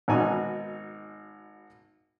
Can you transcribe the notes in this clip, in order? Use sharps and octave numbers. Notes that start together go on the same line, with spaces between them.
G#1 G#2 B2 D#4 F#4 G#5